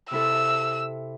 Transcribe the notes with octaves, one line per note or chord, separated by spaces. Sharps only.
C3 E4 A4 E6